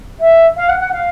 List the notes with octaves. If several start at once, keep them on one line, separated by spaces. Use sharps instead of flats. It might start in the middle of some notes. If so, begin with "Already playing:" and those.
E5
F5
F#5
F#5
F5